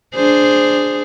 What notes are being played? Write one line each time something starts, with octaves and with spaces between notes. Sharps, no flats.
D4 G#4 C5